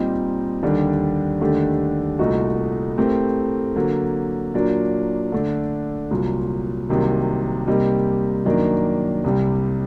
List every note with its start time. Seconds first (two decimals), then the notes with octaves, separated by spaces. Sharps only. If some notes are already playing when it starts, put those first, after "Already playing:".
Already playing: A#2 G3 C4 D#4 G4
0.63 D#2 D3 G3 D4 G4
1.41 D#2 D3 A3 D4 G4
2.19 C2 A#2 A3 D#4 F#4
2.97 A2 A3 C4 G4 A#4
3.76 D3 F#3 A#3
4.54 A#2 F#3 A#3 D4
5.32 D3 A3 D4
6.11 C2 A#2 F#3
6.89 C2 C3 D#3 F#3 A#3
7.67 C3 G3 A#3 D#4
8.46 F#2 D#3 F#3 A#3 D4
9.24 C2 C3 G3